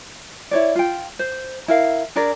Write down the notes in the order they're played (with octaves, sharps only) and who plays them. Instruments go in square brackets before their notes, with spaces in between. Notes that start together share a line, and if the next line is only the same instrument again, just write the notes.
[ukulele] E4 C#5 D5
F4 G5
C5
E4 A#4 F5
D4 G#4 A#4 D5